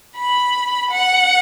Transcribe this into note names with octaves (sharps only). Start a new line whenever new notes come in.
B5
F#5